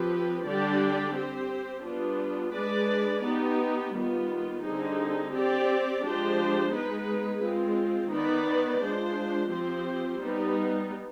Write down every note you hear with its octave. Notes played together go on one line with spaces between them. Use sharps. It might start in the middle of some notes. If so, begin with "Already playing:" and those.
Already playing: F3 C4 G4 B4
D3 G3 D4 G4 D5
C4 G4 C5
G3 B3 D4 F4
G#3 D4 G#4 B4 D5
B3 D#4 G4
D#3 G3 B3 F4
D3 G3 C4 D#4 G#4
C4 G4 D5
F3 G#3 D4 G4 C5
G#3 B3 D#4 G#4 B4
G#3 C4 F4
D#3 B3 D#4 B4 D5
G#3 D4 F4 C5
F3 C4 G4 C5
G3 B3 D#4